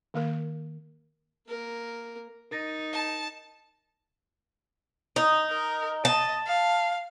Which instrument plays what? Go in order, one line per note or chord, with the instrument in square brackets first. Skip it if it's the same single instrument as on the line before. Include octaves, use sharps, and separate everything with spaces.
[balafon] D#3 A#3 A#4
[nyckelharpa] A#3 A#4
[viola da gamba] D#4 [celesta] A#4 A6 A#6
[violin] A5
[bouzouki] D#4
[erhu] A#4
[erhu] D#5 [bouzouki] A5
[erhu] F5